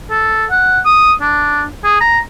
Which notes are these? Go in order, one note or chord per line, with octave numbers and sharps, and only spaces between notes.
A4
F#5
D#6
D4
G#4
A#5